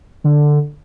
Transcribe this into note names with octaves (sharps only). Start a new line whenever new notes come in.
D3